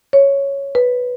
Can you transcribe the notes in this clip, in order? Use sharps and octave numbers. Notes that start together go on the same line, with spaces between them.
C#5
B4